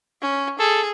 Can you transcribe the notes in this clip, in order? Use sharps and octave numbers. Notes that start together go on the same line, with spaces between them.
C#4
G#4 A4